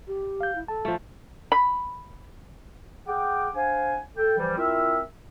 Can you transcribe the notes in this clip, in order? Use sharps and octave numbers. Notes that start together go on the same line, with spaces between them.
G4
F5 G6
E4
A4 A5
F3 A3
B5
G#4 F#5 G5 D6
D4 C5 F5 F#5 G#5
A4 G5
E3 F3 G3
C4 E4 F4 A#4 E5